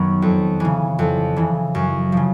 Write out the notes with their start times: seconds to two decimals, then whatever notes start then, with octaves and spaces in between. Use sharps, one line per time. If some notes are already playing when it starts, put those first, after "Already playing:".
Already playing: F#2 D#3 F#3 B3
0.22 F2
0.60 C#3 E3
0.99 F2
1.36 C#3 E3
1.75 F#2
2.12 C#3 F3